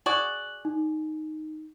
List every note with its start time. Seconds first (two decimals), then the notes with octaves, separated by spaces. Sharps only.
0.06 F#4 G#4 D5 F#6 F#7
0.65 D#4